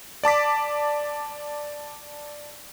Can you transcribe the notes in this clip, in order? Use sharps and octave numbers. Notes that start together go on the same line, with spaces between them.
D5 A5 D6 B6